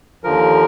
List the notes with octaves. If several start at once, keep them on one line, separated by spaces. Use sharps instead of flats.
D#2 D3 F3 A#4